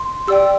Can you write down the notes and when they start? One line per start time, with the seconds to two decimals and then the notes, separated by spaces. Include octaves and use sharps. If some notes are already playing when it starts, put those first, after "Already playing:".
Already playing: C6
0.28 G4 D5 G5 E6